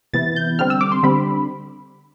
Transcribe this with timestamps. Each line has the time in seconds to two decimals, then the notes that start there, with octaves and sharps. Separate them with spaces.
0.13 C3 E3 B3 E4 A6
0.36 G6
0.59 D3 G3 C4 F6
0.70 E6
0.81 D6
0.92 C6
1.03 D3 G3 C4 B5